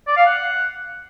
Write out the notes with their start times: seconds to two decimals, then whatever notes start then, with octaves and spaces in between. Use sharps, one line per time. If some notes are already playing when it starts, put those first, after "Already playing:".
0.07 D5
0.17 F5
0.26 F#5